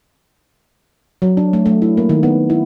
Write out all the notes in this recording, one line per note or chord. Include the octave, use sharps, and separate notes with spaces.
F#3
D4
A3
A3
E4
A#3
D#3
B3
E4